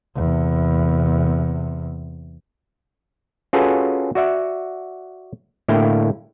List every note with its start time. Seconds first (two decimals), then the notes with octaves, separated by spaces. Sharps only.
0.16 E2 C3
3.53 C#4 F4 F#4 G#4 A4 B4
4.15 F#4 D5 E5 F#5
5.68 A2 D3 A#3 E4 F5 G5